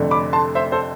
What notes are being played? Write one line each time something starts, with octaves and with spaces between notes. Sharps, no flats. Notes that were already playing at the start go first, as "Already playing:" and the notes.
Already playing: F1 F2 D3 A3 D4
B5 D6
A5 C6
C5 E5
A4 C5